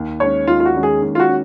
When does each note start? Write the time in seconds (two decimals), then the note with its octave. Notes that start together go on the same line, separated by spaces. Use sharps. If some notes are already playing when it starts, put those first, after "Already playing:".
Already playing: D#2
0.20 D#3 G#3 C#4 C#5
0.47 D#2 F4
0.60 F4
0.65 F#4
0.74 D#3 G#3 C#4
0.83 G#4
1.02 D#2
1.15 F4
1.20 F#4
1.29 C#4